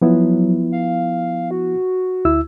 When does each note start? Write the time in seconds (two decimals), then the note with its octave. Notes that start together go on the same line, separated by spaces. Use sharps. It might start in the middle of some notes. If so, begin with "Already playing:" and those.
0.02 F3 F#3 B3 E4
0.72 F5
1.51 F#4
2.25 D2 E4 E6